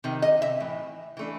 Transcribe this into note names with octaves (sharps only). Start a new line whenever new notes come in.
C3 D#3
D#5
E5
A2 E3
E3 A3 D4